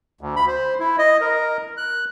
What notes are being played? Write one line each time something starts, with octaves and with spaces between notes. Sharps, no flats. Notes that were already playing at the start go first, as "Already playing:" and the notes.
D2
B5
C5
E4
D#5
A#4
F#6